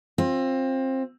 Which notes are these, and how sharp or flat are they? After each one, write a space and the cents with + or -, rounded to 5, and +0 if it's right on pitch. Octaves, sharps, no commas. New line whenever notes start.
C4 +20 F4 +20